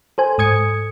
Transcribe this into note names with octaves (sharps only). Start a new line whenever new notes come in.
A4 C5 G#5
G#2 D#6 G#6 C#7